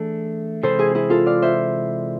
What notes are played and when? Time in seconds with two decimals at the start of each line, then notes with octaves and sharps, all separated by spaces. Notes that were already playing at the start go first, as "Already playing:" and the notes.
Already playing: E3 A3 D4 G#4 A4
0.63 C3 E3 G#3 A4 C5
0.79 E4 G#4
0.95 E4 G#4
1.10 F4 A4
1.26 D5 F5
1.42 C5 E5